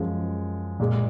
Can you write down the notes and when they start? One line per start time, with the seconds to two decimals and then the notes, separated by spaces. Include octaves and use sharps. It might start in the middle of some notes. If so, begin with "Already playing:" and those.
Already playing: F#2 F3 G#3
0.80 A#2 G#3